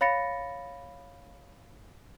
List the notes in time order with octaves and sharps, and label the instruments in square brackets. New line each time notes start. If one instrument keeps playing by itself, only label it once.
[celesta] C#5 F5 B5 A6 A#6 C#7